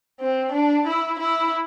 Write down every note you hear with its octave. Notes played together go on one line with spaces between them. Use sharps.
C4
D4
E4
E4